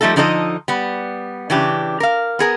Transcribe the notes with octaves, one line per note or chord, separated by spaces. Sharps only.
F3 G3 A3 D#4 A4
D3 F3 D#4 A4 D5 D#5
G3 B3
C#3 E3 D4 G4
A#4 F5
B3 G#4 A#4